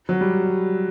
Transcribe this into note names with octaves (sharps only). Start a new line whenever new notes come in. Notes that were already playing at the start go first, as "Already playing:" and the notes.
F#3
G3